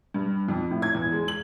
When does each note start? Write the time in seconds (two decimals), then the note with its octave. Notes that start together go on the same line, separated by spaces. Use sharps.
0.14 G2
0.48 F2
0.71 A2
0.82 G#6
0.95 E2
1.12 G#3
1.28 F#7